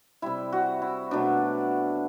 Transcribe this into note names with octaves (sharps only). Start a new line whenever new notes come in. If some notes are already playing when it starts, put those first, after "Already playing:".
C3 G3 E4
F#4
E4
B2 F#3 A3 D4